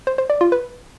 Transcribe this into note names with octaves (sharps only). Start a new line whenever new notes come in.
C5
C5
D5
F4
B4